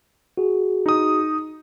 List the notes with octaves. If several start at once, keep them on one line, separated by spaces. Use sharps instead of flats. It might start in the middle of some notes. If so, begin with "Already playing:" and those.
F#4 G#4
D#4 D#6